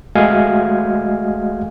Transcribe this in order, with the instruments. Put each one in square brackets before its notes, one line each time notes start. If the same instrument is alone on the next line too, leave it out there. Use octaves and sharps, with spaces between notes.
[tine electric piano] G#3 A3 F#4 D#5 F5 G#5